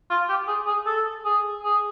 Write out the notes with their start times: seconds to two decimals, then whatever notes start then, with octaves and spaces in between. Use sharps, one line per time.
0.10 F4
0.29 G4
0.48 G#4
0.67 G#4
0.86 A4
1.25 G#4
1.64 G#4